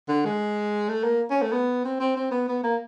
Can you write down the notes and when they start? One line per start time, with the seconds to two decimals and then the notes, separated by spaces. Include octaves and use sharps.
0.08 D3
0.25 G#3
0.89 A3
1.04 A#3
1.30 C#4
1.42 A3
1.52 B3
1.85 C4
2.00 C4
2.16 C4
2.31 B3
2.48 B3
2.64 A#3